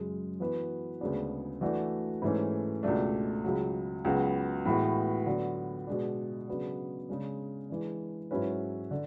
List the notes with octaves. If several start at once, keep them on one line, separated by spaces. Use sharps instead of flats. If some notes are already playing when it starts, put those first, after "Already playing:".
Already playing: F#2 C#3 G#3
E3 B3 F#4 B4
D2 C#3 G#3 B3 D4
E3 A3 D4 F#4
G#2 E3 A3 C#4
C#2 B2 A3 D4
C#2 C#3 F#3
C#2 C#3 F#3 B3 F#4
A2 E3 G#3 B3 F#4
D3 F#3 B3 F#4
B2 G#3 D4
C#3 F#3 B3 D4
C#3 G#3 D4
E3 G#3 D4
G#2 F#3 C#4 E4 B4
D3